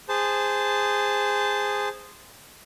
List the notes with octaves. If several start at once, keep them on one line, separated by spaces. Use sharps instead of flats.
G#4 C5 A5